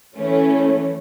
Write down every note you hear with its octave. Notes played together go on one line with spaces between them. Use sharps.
E3 A3 C#4